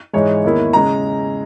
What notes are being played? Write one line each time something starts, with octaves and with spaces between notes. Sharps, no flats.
G#2 E3 G#3 C#5
E2 D#3 A#3 E4
C#3 G#3 A#5